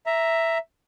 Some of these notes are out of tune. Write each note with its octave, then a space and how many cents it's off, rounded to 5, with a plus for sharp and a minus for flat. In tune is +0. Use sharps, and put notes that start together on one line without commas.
E5 +0 A#5 +0